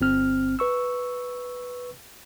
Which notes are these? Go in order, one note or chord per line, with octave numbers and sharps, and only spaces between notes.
G1 C4 F6
B4 C#6 E6